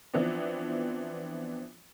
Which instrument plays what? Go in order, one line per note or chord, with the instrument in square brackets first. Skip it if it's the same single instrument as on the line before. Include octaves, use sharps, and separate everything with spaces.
[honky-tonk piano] E3 F3 B3 C4 D4